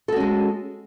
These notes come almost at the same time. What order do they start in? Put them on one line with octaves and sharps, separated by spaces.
A4 F#4 C#4 G#3